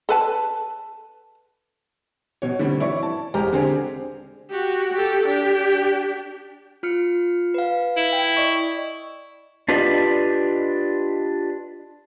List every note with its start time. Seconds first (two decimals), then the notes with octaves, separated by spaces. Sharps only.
0.09 A4 B4 A5
2.42 B2 C#5
2.59 D3 G3 A3 C4
2.80 E3 E4 C#5 D5 C#6
3.03 A5
3.34 E1 G#3 G4 C5 A#5 F6
3.53 D3 C4 D4 G4 G#4 C5
4.51 F#4 G4
4.92 G4 A4
5.27 D4 G4
6.83 F4 F6 C#7
7.54 B4 F5
7.97 E4
8.13 G5
8.37 D5 D#5 C#6
9.69 D4 F4 G4 B4 D5 D#5